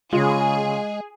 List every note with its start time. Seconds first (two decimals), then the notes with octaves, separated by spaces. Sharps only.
0.13 C#3 G#3 F4 G#4